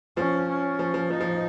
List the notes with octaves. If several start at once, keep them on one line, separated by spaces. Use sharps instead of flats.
F3 C#4
C#4
F3
F3
F3 D#4
F3